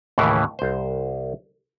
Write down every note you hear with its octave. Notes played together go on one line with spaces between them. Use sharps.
D#2 A2 C#3 E3 E4
C2 C5